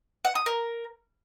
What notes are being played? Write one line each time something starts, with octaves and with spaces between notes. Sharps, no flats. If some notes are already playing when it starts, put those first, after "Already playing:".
F#5
D#6
A#4